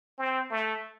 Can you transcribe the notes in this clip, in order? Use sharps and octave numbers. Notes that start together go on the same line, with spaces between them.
C4
A3